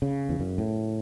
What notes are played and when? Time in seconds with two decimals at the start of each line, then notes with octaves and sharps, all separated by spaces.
0.02 C#3
0.29 E2
0.40 F#2
0.58 A2